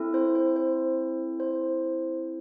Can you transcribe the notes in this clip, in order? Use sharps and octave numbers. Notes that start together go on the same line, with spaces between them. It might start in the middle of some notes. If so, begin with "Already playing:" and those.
Already playing: C4 E4 A4
C5
C5
C5
C5